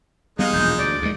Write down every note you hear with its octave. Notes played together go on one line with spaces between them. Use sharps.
G3 G#3 B3 D#4 F5
E1 A#1 G6
D2 D5
D#2 G#3